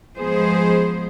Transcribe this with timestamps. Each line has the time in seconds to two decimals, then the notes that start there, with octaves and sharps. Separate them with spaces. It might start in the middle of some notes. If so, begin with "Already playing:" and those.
0.18 F3 G#3 B3 G#4 C5